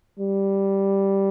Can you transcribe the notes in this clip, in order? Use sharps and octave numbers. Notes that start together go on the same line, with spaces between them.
G3